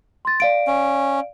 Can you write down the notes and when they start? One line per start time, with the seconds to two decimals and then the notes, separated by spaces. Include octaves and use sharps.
0.25 C6 A6
0.40 D5 F5 D7
0.67 C#4